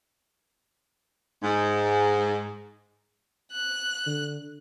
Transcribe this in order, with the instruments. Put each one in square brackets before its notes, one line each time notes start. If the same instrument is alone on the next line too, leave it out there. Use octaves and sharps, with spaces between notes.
[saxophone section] G#2
[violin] F#6
[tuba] D3